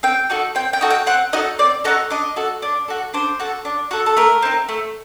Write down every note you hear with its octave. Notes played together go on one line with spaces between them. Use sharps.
C4 G5
D#4 F#4 A4
C4 G5
G5
D#4 F#4 A4
G5
C4 F#5
D#4 F#4 A4 D#5
C4 D5
D#4 F#4 A4 D#5
D4 D#5
F#4 A4
D4
F#4 A4
D4 C5
F#4 A4
D4
F#4 A4
A4
A3 A#4
C4 D#4
A3